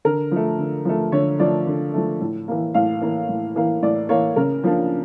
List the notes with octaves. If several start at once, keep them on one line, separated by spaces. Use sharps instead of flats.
D3 A#4
F3 A3
D3
F3 A3
D3 C#5
F3 A3 D5
D3
F3 A3
A2
E3 A#3
A2 F5
E3 A#3
A2
E3 A#3
A2 D5
E3 A#3 C#5
C#3 A#4
F3 A#3 D4